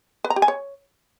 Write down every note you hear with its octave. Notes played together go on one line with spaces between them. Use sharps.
B4
A#5
G4
G#5
C#5